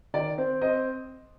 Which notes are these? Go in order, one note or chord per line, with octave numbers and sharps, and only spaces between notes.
D#3 D5
C4
C4 D#5